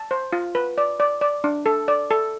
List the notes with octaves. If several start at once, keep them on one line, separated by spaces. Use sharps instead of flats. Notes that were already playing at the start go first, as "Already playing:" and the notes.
Already playing: A5
C5
F4
B4
D5
D5
D5
D4
A4
D5
A4